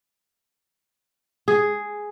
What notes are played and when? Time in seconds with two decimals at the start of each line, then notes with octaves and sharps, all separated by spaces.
1.48 G#4